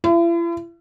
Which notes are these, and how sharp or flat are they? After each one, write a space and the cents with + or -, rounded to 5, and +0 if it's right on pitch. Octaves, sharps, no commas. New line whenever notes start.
E4 +45